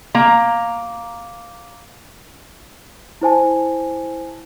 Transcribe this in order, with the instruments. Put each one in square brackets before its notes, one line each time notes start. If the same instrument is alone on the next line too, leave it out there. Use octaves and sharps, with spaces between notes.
[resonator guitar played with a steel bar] A#3 A#5
[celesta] E4 C5 G#5 A5